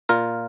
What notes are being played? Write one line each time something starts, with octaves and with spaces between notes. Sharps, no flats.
A#2 F4 A#4